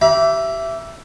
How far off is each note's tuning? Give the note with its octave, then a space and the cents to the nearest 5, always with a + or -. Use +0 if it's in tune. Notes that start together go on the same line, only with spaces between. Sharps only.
G4 -25 E5 +15 A#5 +45